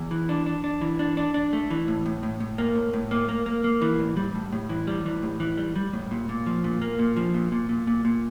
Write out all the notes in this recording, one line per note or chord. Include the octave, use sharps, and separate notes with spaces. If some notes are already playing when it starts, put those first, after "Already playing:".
Already playing: E2
E3
D4
D4
D4
E3
D4
D4
D4
A3
E3
A2
A2
A2
A2
A#3
A2
A2
A#3
A#3
A#3
A#3
E3
A2
G3
A2
A2
E3
G3
E3
A2
E3
G3
G3
A2
A#2
A#2
F3
A#2
A#3
A#2
F3
A#2
A#2
A#2
A#2
A#2